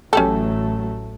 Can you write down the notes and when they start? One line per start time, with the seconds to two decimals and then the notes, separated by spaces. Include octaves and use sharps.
0.13 A1 F#3 A3 C#4 G4 A4